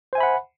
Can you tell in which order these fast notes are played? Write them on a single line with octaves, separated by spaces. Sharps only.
C5 G#5 E5 B5 F#5